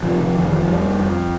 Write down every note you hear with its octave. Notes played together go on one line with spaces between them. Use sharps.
C3 F3
F3
F1 D#3
F3
F1 G3
F2